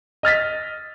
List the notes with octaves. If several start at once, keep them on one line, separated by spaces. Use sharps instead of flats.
D#5 F6 A6 B6